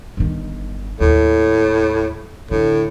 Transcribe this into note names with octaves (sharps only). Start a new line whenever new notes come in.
G1 D#3
D#2 A2
A2 D3